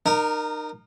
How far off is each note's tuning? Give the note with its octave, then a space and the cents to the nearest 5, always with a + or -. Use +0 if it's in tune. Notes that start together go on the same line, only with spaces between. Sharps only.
D#4 -30 A#4 +0